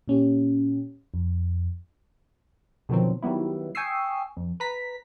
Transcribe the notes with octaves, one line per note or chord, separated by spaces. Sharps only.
A#2 C#4 G4
F2
B2 D3 D#3 F3 F#3 C4
D#3 F#3 G3 B3 E4
G5 G#5 C#6 D#6 E6 C7
F2
B4 A#5 B6